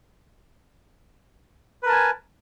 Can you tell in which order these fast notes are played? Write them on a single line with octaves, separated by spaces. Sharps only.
B4 A#4 A5 G#5